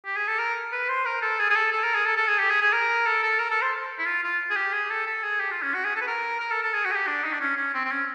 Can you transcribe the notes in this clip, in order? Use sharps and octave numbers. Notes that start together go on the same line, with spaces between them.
G4
G#4
A4
A#4
B4
C5
A#4
A4
G#4
G#4
A4
A4
A#4
G#4
A4
A4
G#4
G4
G#4
G#4
A#4
A4
A4
A#4
A4
C5
E4
F4
F4
G#4
G4
G#4
A4
A4
G#4
G4
F4
C#4
F#4
G#4
A4
B4
A#4
A#4
A4
A4
G#4
F#4
G#4
G4
D4
D#4
D4
C#4
C#4
C4
C4
C#4